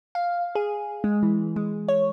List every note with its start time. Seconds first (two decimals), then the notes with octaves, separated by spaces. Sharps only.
0.15 F5
0.55 G#4
1.04 G#3
1.23 E3
1.56 G#3
1.88 C#5